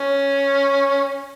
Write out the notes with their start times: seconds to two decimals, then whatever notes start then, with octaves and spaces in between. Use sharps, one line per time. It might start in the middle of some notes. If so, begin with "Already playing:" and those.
Already playing: C#4